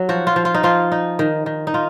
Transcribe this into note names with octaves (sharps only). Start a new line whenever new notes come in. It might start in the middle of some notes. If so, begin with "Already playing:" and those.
Already playing: F#3
F3 F#4
F4
F3
F4
D#4
F3 F4
D#4
D#3
D#3
D#4
D#3 F4